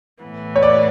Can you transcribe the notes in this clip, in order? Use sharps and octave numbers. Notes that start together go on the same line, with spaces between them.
A2 E3 B3
C#5
D5